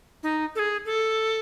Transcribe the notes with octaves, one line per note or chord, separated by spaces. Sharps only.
D#4
A4
G#4
A4